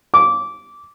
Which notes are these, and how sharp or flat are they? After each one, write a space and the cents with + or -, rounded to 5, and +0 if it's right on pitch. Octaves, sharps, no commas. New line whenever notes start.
D6 -15